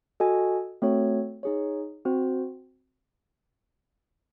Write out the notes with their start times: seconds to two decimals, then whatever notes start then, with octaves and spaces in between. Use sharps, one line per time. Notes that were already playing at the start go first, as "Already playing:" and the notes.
0.20 F#4 A4 D#5 G#5
0.82 A3 C4 F#4 A4 C#5
1.43 D#4 G#4 C#5
2.05 C4 F#4 C5